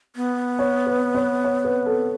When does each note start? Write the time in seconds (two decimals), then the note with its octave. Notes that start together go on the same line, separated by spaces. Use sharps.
0.16 B3
0.59 C#5
0.86 B4
1.15 C#5
1.44 C#5
1.65 B4
1.86 A4